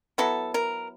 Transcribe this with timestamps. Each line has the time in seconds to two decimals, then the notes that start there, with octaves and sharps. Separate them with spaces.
0.18 F#3 B3 E4 A4
0.54 A#4